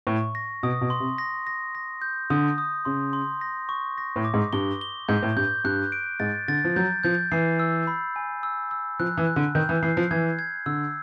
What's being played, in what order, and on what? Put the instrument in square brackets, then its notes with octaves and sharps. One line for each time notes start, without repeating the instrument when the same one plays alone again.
[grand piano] A2 [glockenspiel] C#6
[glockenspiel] A#6
[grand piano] B2 [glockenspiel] D#6
[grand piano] B2
[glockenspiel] C6
[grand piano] C3
[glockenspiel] A#6
A#6
A#6
G6
[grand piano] D3 [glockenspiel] D#6
[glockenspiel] D#6
[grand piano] C#3 [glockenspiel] C6
[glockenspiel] C6
A#6
C#6
A#6
[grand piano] A2
[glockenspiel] D6
[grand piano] G#2
[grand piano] G2 [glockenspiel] G7
[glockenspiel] G7
[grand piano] G#2 [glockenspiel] G6
[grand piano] A2
[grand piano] G2 [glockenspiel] G6
[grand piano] G2 [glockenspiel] F#6
[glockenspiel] D7
[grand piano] G#2 [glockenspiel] A6
[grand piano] D3 [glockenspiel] A6
[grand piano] F3
[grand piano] F#3 [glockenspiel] G6
[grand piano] F3 [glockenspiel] G6
[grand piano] E3 [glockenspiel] C7
[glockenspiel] E6
B5
G#5
E6
E6
[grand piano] F3 [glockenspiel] F#6
[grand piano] E3
[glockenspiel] F#6
[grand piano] D3
[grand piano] D#3 [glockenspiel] G6
[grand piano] E3
[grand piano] E3 [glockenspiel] C7
[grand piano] F3
[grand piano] E3 [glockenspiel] G#6
[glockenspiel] G#6
[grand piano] D3 [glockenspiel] E6